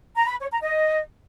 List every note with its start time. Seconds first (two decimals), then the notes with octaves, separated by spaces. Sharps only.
0.16 A#5
0.28 B5
0.39 C#5
0.51 A#5
0.62 D#5